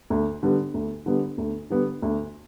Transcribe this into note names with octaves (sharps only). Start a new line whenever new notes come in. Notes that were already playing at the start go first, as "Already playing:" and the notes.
D2
D3 G3 B3
D2
D3 G3 B3
D2
D3 G3 B3
D2